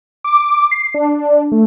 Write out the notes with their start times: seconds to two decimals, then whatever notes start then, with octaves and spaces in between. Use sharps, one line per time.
0.24 D6
0.71 C7
0.94 D4
1.52 A3